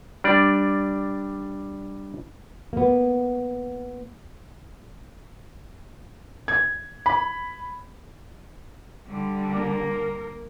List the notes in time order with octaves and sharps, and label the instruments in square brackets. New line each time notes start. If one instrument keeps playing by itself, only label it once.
[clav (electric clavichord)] G3 D4 D5
[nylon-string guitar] A#3 B3
[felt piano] G#6
B5
[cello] D3 G3
[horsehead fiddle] A#3 A#4